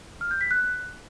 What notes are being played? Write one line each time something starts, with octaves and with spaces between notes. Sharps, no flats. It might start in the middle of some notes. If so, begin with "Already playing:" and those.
F6
G6
B6
F#6